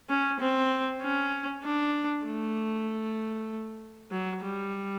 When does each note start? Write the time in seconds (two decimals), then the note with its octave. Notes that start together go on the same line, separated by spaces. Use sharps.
0.09 C#4
0.40 C4
1.02 C#4
1.64 D4
2.25 A3
4.11 F#3
4.42 G3